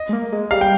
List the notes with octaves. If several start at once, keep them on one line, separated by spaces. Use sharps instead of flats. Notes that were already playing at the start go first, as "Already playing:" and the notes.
Already playing: D#5
G#3
A#3
G#3
G3 F5
G5